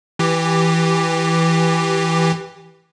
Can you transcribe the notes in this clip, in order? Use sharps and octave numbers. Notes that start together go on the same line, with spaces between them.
E3 G4